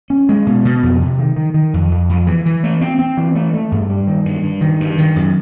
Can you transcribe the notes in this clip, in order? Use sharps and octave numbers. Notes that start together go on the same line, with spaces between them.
C#4
G#3
B2
B2
F2
C3
D#3
D#3
D#3
F2
F2
F2
E3
E3
A3
C4
C4
E3
A3
A3
G2
G3
D#3
G2
G2
D#3
G2
D#3
F#2